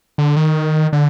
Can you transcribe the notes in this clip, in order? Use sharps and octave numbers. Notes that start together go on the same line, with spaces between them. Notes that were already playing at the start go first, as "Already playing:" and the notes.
D3
D#3
D3